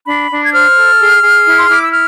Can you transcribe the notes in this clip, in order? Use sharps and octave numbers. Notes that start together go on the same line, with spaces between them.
D4 B5
D4
G#6
C5 F6
A4
G#4
G#4
E4
C6
E4 D6
E6
F6